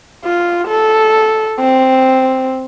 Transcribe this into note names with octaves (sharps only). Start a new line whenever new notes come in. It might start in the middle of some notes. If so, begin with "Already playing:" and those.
F4
A4
C4